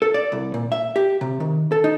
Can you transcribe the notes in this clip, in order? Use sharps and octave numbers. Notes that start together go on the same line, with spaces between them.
A4
D5
C2
A#2
E5
G4
C3
D#3
A4
D#4